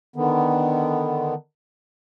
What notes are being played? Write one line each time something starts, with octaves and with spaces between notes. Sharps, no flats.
D3 D#3 B3